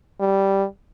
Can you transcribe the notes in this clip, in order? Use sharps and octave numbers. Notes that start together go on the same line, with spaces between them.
G3